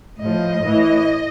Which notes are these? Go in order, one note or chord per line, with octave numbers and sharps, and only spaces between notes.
A2 F3 D#5
A2 E3